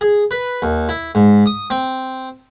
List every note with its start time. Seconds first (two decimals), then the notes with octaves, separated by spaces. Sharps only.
0.01 G#4
0.31 B4
0.62 D#2
0.89 E4
1.15 G#2
1.46 D#6
1.70 C4